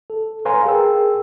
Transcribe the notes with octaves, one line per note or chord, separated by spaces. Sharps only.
A4
B4 C#5 F5 G#5 A#5 C6
G#4 A#4 G5 E6